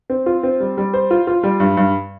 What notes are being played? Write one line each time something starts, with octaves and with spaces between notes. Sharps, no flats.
C4
F4
C4
G3
G3
C5
F4
F4
G3
G2
G2